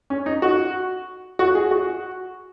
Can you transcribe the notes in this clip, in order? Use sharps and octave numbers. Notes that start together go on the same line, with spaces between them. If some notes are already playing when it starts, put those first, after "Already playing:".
C#4
D#4
F#4
F#4
G#4
F#4